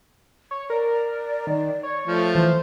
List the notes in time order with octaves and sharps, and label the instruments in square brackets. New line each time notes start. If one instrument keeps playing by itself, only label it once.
[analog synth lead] C#5
[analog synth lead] A#4 [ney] D5
[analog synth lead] D#3
C#5
[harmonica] F3 A3
[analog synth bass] E3 [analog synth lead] C5